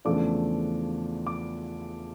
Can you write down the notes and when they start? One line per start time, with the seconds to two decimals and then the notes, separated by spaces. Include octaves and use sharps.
0.05 E2 C#3 F3 A3 D4 D6
1.27 D6